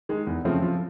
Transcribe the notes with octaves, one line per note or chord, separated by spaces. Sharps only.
D#3 G#3
E2
C#3 F3 A3 C4
F3